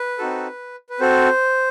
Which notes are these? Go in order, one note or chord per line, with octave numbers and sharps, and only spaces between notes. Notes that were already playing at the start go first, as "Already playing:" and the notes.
Already playing: B4
C4 D#4 F#4 A4
B4
C4 F#4 A4 C5